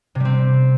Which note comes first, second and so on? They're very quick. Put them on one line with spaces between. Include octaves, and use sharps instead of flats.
C3 G3 C4